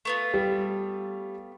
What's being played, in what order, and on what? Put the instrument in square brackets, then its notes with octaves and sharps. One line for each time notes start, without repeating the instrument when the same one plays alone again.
[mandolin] A3 B3 F4
[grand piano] G3